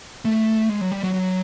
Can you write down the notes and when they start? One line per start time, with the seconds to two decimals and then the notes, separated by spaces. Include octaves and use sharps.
0.25 A3
0.69 G#3
0.81 F#3
0.92 G3
1.04 F#3
1.14 F#3